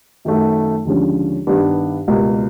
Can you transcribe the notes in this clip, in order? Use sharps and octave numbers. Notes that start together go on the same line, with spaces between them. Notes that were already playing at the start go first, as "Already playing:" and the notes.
F#2 D#3 F#3 A3
D#2 D3 F3 G#3 C#4
G2 D#3 G3 B3 D4
C#2 B2 G3 A#3